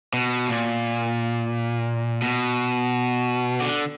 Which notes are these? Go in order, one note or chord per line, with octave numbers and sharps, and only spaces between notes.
B2
A#2
B2
D3